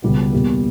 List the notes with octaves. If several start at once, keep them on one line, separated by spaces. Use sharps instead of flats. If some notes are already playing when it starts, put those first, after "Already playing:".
C#2 B2 G3 B3 G4
E2 B2 G3 A#3